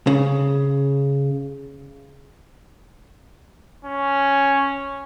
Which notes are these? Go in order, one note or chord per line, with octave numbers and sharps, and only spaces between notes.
C#3
C#4